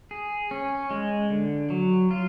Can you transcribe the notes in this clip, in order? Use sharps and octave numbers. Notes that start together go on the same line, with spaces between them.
G#4
C#4
G#3
D3
F#3
F4